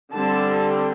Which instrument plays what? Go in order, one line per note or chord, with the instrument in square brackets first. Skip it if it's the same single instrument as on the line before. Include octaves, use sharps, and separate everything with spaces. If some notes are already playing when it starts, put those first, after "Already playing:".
[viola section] D3 G3 C4 A5